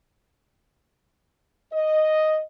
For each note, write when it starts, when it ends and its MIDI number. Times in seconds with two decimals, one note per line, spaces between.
1.73 2.41 75